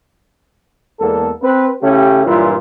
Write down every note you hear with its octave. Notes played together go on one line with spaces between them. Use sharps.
E2 G#3 A#3 B3 A4
C4 B4
C#3 A3 C#4 E4 G4
G2 A#2 E3 F#3 E4 F4